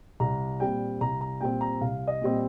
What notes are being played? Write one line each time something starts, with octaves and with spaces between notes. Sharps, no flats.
C2 A#5
A#2 G3 C4 G5
C2 A#5
A#5
A#2 G3 C4 G5
A#5
C2 F5
D#5
A#2 G3 C4